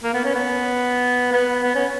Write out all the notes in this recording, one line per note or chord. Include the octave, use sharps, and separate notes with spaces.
A#3
B3
C#4
B3
B3
B3
C#4